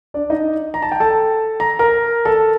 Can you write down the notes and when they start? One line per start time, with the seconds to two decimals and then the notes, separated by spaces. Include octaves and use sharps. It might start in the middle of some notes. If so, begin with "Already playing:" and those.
0.14 D4 D5
0.30 D#4 D#5
0.74 A#5
0.82 A5
0.92 G5
1.00 A4 A5
1.60 A#5
1.79 A#4 A#5
2.25 A4 A5